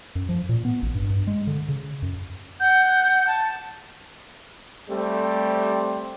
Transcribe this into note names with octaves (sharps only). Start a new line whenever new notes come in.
F#2
F3
A#2
B3
A1
G2
G2
G#3
D3
C#3
F#2
F#5 G6
A5
G3 A3 C4 G4